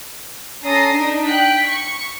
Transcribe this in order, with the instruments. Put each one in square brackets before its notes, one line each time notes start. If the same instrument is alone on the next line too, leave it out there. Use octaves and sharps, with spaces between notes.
[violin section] C#4 A4 A#5 D#6 A#6 C7
D4 D#4
G5 F#6 B6
C#6